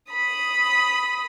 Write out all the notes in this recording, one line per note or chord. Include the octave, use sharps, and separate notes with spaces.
B5 D#6